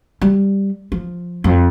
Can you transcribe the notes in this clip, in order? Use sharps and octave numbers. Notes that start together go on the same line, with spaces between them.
G3
F3
F2